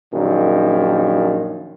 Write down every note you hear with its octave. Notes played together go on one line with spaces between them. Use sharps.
A#1 F#2 A#2 D#3